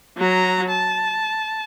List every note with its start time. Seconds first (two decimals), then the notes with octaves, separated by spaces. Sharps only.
0.18 F#3 A#5
0.69 A5